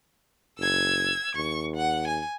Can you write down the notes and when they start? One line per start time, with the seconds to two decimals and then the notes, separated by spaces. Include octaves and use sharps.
0.59 F#1 E6 G#6
1.35 D#2 C#6
1.76 F#5
2.08 G#5